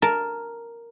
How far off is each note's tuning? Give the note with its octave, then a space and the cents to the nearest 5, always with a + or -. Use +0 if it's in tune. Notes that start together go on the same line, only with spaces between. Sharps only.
A#4 +0 A5 +0